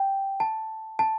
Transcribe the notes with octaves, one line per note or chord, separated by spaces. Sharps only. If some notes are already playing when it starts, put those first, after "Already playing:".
Already playing: G5
A5
A5